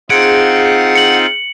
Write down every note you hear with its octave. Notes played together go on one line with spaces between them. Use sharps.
C4 D#4 F4 G#4 F#5 C#7 D7
C#7 F#7